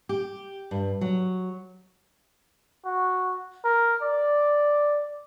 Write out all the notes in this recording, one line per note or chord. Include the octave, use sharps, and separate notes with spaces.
G4
G2
F#3
F#4
A#4
D5